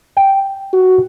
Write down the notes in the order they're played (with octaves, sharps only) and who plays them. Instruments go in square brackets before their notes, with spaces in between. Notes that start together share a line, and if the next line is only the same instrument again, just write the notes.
[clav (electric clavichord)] G5
[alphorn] F#4